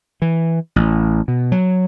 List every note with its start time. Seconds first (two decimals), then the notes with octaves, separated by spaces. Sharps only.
0.22 E3
0.76 A1
1.28 B2
1.52 F#3